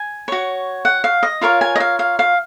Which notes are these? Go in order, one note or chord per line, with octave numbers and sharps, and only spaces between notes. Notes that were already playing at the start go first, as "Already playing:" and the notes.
Already playing: G#5
F#4 C#5
F#5
F5
D#5
F4 A#4 C#5 F5
G#5
D#5
F5
F5
F5